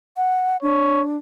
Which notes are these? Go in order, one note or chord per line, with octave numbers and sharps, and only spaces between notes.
F#5
D4 C#5